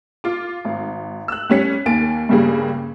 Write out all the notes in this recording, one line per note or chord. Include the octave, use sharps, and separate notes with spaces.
F4 D6
G#1
E6 F#6
G3 C#4 B6 C#7
D#2 A#3 G#5 A6 D7
G2 C#3 G3 A#3 G#4